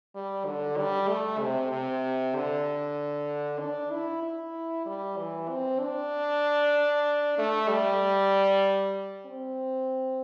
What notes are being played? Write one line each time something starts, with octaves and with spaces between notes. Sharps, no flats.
G3
D3
G3
A3
C3
C3
D3
D4
E4
E4
G3
E3
C4
D4
A3
G3
C4